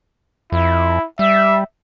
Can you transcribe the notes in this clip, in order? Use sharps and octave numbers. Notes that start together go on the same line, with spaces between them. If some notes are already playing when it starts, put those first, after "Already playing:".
F2 E4
G3 E5